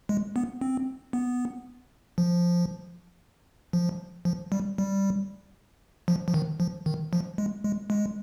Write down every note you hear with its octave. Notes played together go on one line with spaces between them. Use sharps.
G#3
B3
C4
B3
F3
F3
F3
G3
G3
F3
F3
D#3
F3
D#3
F3
G#3
G#3
G#3